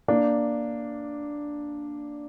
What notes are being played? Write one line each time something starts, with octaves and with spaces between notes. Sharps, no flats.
A#3 D4